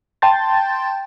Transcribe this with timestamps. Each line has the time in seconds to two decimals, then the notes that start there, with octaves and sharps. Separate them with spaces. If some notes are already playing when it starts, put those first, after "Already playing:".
0.22 G5 A5 C6 G6 A6